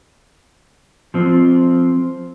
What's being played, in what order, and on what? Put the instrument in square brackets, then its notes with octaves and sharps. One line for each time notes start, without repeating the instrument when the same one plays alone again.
[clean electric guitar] F3 C4